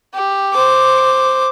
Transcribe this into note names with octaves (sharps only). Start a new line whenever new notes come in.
G4
C5 D6